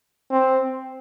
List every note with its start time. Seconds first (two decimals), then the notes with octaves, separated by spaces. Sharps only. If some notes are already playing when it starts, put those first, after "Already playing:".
0.31 C4